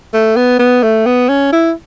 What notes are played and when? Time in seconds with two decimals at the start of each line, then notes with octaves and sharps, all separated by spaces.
0.14 A3
0.37 B3
0.59 B3
0.83 A3
1.06 B3
1.29 C#4
1.53 E4